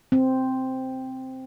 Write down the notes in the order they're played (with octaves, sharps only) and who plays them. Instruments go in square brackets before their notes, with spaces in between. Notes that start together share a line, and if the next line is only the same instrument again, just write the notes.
[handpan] C4